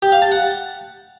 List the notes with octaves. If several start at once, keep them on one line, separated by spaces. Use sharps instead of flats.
G4
F5
A5
F#5